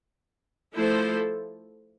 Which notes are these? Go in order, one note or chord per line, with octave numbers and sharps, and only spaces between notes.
F3 A3 E4 A4 C5